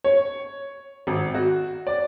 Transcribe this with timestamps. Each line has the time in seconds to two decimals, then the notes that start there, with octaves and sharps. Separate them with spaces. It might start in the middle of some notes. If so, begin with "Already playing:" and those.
0.04 C#5
1.07 G#1
1.34 F#4
1.87 D5